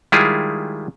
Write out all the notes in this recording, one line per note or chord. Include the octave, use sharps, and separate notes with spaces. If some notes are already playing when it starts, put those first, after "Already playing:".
D#3 G3 G#3 E4 F4 G#4